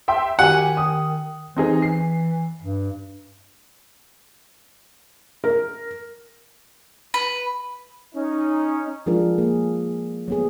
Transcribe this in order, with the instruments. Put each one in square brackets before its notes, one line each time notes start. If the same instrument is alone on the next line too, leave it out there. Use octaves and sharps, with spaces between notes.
[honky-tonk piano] E5 G5 C6
[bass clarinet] D#3 [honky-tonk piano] F#4 G4 G#5 [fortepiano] F#5
[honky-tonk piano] D#6
[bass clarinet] E3 [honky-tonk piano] C4 D#4 G#4
[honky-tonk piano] C7
[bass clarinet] G2
[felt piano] A#4
[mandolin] B4
[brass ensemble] C#4 D#4
[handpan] F3 G#3 D4 F4 G#4 A#4
A#3 G#4
F#3 B3 G#4